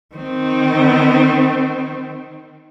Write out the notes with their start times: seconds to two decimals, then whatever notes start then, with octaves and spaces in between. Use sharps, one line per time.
0.15 D#3 C4